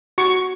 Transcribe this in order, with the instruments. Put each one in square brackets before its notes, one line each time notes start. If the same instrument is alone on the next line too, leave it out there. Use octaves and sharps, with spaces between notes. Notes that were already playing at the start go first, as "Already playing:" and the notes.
[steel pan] F#4 C#6